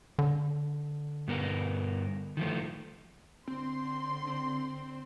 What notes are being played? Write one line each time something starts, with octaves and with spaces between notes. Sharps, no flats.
D3
G2 B3 A#4
D#3 F3 A3
D3 C4 C6
C4